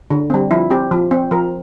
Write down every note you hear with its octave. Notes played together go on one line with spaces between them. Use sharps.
D3
G3 C4
F3 E4
C4 G4
F3
C4
F3 A#4